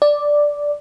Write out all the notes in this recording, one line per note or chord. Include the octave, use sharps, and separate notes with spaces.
D5